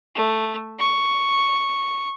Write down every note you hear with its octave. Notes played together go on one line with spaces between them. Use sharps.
A3
C#6